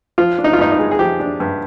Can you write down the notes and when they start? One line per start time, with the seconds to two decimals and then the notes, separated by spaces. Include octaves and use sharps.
0.18 F3 F4
0.38 D4
0.44 D#4
0.53 F4
0.58 G2 D#4
0.72 D#4
0.79 G#3
0.91 G#4
0.99 F3 G4
1.20 D4
1.40 G2